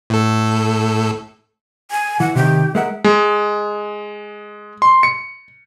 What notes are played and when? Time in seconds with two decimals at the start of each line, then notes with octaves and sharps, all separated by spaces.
0.10 A2 A4
1.91 G#5
2.20 E3 F#5
2.35 C3 D#3 G4
2.75 G#3 A#4 E5 F#5
3.04 G#3
4.82 C6
5.03 C#7